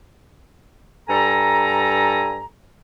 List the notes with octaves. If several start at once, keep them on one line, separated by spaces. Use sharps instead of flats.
G2 A4 G#5 A#5